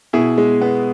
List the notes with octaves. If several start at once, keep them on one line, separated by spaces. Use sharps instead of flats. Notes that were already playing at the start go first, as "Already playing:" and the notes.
B2 E4 G#4
G#3
B3